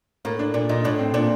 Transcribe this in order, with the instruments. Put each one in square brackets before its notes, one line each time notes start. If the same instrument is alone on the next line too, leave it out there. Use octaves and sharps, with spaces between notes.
[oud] A2 [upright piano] A#3
[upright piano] D4
[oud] A#2 [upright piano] D4
[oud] A#2 [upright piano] D#4
[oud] A2 [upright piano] D4
[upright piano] C4
[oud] A#2 [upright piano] D4